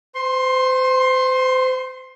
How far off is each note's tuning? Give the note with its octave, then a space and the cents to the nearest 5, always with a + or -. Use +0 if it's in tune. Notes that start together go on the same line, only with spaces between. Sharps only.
C5 -30 C6 +20